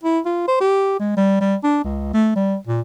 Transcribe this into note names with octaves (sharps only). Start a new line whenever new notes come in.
E4
F4
C5
G4
G#3
G3
G3
D4
C#2
A3
G3
A#2